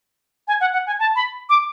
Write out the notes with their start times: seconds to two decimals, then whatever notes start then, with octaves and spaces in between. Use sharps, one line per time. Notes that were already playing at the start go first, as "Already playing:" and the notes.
0.48 G#5
0.61 F#5
0.73 F#5
0.87 G#5
0.99 A5
1.16 B5
1.50 D6